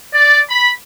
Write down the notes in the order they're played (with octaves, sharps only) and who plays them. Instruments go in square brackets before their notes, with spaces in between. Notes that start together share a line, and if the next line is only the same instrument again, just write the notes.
[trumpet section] D5
B5